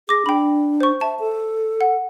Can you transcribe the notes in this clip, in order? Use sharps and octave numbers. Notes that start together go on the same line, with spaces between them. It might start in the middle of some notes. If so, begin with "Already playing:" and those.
G#4 D6 A#6
D4 G5 B5
C5 C#6
E5 A5
A4
F#5